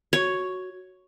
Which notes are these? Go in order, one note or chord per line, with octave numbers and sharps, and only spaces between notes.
F#4 C#5